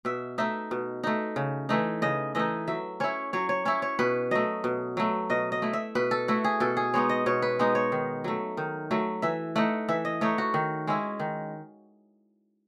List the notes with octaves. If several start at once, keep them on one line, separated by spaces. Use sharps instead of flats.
B2 E5
A3 D#4 E5
B2
A3 D#4
C#3
E3 A3 D#4
C#3 D#5
E3 A3 D#4 D#5
F#3 E5
C#4 E4 C#5
F#3 C#5
C#5
C#4 E4 C#5
C#5
B2 B4
F#3 A3 D#5
B2
F#3 A3
B2 D#5
D#5
A3 E4
E5
B2 B4
A4
A3 E4 F#4
G#4
B2 A4
G#4
G#3 B3 D#4 C#5
D#5
B2 C#5
B4
G#3 B3 D#4
C#5
D#3
F#3 A3
D#3
F#3 A3
E3 E5
A3 D#4 F#5
E3 E5
D#5
A3 D#4 C#5
F#4
D#3
G#3 C#4 E4
D#3